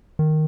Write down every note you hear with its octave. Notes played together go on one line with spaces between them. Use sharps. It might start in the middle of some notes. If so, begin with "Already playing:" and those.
D#3